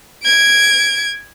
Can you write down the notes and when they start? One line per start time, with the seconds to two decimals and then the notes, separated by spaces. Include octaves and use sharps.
0.23 G#6 D7